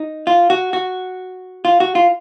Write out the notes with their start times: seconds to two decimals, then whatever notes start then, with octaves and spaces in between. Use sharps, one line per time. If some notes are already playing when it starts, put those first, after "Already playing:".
Already playing: D#4
0.27 F4
0.50 F#4
0.73 F#4
1.65 F4
1.80 F#4
1.95 F4